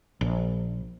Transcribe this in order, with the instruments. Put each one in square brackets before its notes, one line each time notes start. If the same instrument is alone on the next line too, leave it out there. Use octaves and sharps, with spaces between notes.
[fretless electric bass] A#1